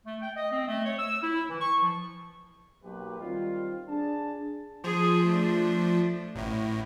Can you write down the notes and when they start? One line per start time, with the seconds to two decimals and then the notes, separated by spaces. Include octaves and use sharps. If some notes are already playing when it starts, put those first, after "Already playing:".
0.06 A3
0.22 G5
0.36 D#5
0.51 C4
0.68 A3
0.85 C#5
0.98 E6
1.22 E4
1.49 E3
1.61 C#6
1.82 F3
2.84 B1 F#3 A#3 G4 B4
3.20 D#3 G3 C4 F4
3.89 D4 G#4 A5
4.84 F3 G#4
5.26 A3 D4
6.35 A1 A2